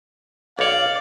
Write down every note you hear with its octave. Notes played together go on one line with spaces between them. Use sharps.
B1 C#5 D5 F5